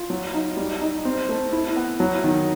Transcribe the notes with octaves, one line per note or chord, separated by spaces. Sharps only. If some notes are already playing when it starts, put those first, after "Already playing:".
Already playing: F4
F#3
D#4
G3
D#4
C4
A3
E4
B3
F#3
D#3